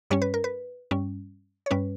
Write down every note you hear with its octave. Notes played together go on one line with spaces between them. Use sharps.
G2 G3 C#4 C#5
B4
A#4
B4
G2 G3 C#4
C#5
G2 G3 C#4 B4